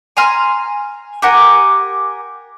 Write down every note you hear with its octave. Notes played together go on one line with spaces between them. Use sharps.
G#5 A#5 C6 F6
G4 A#4 F#5 G#5